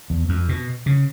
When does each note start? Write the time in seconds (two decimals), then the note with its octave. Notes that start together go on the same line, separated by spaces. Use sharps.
0.10 E2
0.29 F2
0.49 B2
0.86 C#3